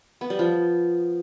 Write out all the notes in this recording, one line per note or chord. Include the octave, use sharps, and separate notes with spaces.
B3
G3
F3